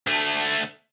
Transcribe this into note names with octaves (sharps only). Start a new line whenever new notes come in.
D2 A3